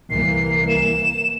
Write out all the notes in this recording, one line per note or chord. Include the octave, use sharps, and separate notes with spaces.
C2 E3 A#3 C7
E7